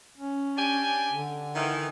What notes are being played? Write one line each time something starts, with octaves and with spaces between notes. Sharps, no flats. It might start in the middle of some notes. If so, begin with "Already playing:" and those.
C#4
D4 G4 G#5
D3
D#3 E3